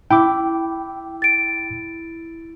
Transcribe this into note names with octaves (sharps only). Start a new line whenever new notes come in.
E4 G5 D6
A6 D7